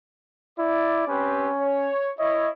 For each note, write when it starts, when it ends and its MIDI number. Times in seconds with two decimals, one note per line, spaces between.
0.59 1.07 64
0.59 1.04 74
1.08 1.49 60
1.08 1.91 61
1.08 1.49 67
1.08 1.49 71
1.60 2.10 73
2.19 2.48 64
2.19 2.48 73
2.19 2.50 75